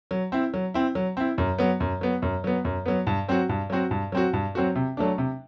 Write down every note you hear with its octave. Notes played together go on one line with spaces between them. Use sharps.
F#3
C4 E4
F#3
C4 E4
F#3
C4 E4
F#2
F#3 B3
F#2
F#3 B3
F#2
F#3 B3
F#2
F#3 B3
G2
F#3 C4 F#4
G2
F#3 C4 F#4
G2
F#3 C4 F#4
G2
F#3 C4 F#4
C3
F#3 A3 D4
C3